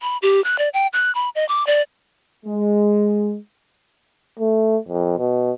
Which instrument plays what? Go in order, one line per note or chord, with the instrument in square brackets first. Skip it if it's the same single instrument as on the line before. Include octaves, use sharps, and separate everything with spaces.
[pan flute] B5
G4
F#6
D5
G5
F#6
B5
D#5
D6
D5
[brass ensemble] G#3
[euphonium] A3
F2
B2